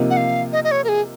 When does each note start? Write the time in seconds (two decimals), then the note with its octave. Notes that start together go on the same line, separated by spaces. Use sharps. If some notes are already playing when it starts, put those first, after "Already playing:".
Already playing: C3 F3 A#3 D#4
0.10 F#5
0.17 F5
0.53 D#5
0.64 D#5
0.71 C#5
0.84 A#4
0.89 G#4